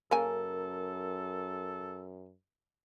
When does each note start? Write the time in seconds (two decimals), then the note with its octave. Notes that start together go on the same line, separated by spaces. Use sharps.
0.11 F#2 C#3 A#3 A4 A#4 G#5